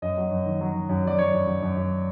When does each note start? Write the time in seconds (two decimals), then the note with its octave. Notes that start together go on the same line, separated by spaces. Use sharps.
0.02 F#2 D#5
0.17 F#3
0.31 F#2
0.46 D#3
0.61 F#3
0.74 D#3
0.89 F#2
1.04 F#3 D5
1.18 F#2 C#5
1.33 F#2
1.47 F#2
1.62 F#2
1.76 F#2